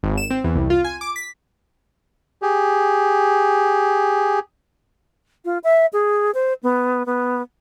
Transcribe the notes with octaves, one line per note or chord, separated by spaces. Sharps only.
G#1
E7
C4
E2
C2
F4
G#5
D6
B6
G4 G#4
F4
E5
G#4
C5
B3
B3